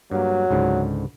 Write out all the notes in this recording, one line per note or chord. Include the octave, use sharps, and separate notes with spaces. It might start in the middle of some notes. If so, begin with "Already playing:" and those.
G2 F#3 A#3
C#2 G#2 D3